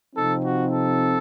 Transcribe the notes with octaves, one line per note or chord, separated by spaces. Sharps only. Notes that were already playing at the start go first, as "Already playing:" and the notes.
C3 F3 C4 D#4 A4
F#4
A4